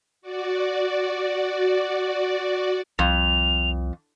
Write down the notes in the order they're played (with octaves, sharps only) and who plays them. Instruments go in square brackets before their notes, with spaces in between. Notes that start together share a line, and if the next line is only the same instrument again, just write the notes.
[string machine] F#4 D5
[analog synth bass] C2 [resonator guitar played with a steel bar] F2 [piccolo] F7